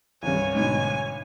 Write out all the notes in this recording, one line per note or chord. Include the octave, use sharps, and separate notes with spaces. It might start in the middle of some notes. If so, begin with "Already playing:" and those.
C2 G2 C#5 G#5
G#2 B2 D3 G#5